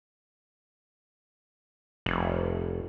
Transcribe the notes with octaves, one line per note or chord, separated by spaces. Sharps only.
F1